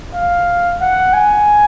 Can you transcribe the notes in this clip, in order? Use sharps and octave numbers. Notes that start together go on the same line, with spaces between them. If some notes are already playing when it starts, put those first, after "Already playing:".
F5
F#5
G#5